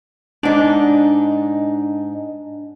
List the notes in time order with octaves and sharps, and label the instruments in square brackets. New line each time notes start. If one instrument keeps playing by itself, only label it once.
[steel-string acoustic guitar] G#2 D#4 [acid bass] D4